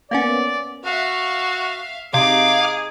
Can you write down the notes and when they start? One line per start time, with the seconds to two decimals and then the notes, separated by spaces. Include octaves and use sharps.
0.11 A#3 B3 C#4 D5
0.85 F#4 E5 F5
2.14 C3 D#4 G#4 F5 D6